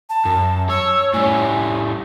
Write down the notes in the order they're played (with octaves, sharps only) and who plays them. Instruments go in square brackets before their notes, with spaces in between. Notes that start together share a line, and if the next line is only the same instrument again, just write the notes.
[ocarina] A5
[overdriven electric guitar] F#2
[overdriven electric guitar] C#5 [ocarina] E6
[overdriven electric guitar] A2 G3 [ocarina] G#5